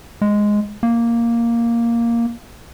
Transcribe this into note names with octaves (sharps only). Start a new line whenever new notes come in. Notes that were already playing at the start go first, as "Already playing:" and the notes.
G#3
A#3